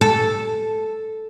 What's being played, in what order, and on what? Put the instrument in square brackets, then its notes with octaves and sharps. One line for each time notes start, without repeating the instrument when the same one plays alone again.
[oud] A4